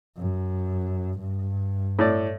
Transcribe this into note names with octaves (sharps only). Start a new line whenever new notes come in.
F#2
G2
A2 A4 D5